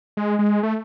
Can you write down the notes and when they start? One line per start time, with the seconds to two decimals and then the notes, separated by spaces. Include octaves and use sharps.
0.17 G#3
0.39 G#3
0.63 A3